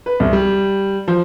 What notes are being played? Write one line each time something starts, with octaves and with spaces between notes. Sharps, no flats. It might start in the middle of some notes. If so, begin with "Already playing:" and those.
B4
C2
G3
F3